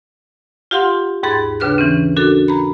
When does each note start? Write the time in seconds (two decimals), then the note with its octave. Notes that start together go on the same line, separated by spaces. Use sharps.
0.71 F4 G4 F5 F#5 C6
1.23 D#2 G#2 G#4 B5 A6
1.60 D#2 C#3 D4 B4 F6 F#6
1.78 E3 C4 C#4
2.16 D4 F#4 A4 A#4
2.48 A#5 B5